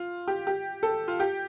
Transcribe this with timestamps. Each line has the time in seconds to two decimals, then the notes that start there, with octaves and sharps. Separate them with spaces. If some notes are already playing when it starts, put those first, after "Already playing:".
Already playing: F4
0.28 G4
0.47 G4
0.83 A4
1.08 F4
1.20 G4